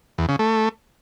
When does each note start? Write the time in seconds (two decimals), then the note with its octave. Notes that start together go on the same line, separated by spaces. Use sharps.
0.18 E2
0.29 C#3
0.39 A3